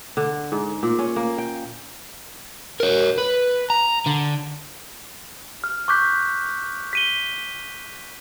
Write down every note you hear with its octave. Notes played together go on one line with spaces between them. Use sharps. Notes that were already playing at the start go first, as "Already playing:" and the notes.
D3
G#2
A#2
C#4
A#3
G5
A#4 C#5
B4
A#5
D3
F6
C#6 D6 F#6 G6 B6
B6 D#7 G7